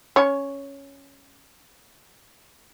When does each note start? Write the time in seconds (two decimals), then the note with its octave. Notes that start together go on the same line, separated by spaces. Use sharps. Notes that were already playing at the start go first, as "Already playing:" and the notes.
0.16 C#4 C#5